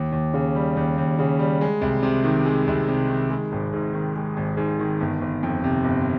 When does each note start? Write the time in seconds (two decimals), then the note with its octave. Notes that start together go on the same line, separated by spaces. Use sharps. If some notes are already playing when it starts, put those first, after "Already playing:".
Already playing: D#2
0.12 D#2
0.34 C#3
0.55 G3
0.76 D#2
0.98 D#2
1.19 C#3
1.39 G3
1.61 G#3
1.81 C2
2.03 C3
2.24 D#3
2.45 G#3
2.67 C2
2.88 C3
3.09 D#3
3.30 G#3
3.52 G#1
3.73 G#2
3.94 D#3
4.16 G#3
4.37 G#1
4.57 G#2
4.79 D#3
5.00 G1
5.21 G1
5.43 F2
5.64 C3
5.84 G1